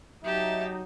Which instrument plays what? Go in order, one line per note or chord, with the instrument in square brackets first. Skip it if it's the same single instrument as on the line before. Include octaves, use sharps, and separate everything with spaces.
[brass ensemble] F#3 D#4 [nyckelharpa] G4 A5 [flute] E5